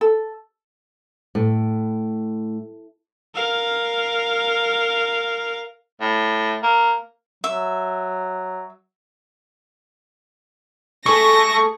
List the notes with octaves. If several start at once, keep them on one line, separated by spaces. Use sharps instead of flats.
A4
A2
A#4 F5
A2
A#3
F#3 E5
A3 G#4 A4 C#6 A#6